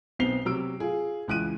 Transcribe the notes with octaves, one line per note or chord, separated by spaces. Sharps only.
B1 B3 C4 C7 F7 G7
C3 F#3 E6 D7
F4 G#4
C#2 E3 F#6 D7 D#7